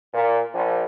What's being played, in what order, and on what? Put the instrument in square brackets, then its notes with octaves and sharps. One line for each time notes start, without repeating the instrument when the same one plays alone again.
[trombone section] A#2
A#1